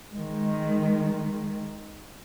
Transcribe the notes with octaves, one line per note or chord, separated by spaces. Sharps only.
D#3 G#3